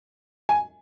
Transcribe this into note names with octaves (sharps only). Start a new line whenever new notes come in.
G#5